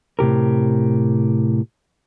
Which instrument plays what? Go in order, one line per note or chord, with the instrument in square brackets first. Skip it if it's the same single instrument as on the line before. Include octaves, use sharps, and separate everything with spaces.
[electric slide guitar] A2 C3 G4 A#4